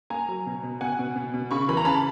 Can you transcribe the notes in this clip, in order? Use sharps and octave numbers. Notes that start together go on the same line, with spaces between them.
A#3 G#5 A#5
F#3
B2
B2
B2 F#5 G#5
B2
B2
B2
C#3 B5 C#6
E3 B5
A#5
C#3 A5 B5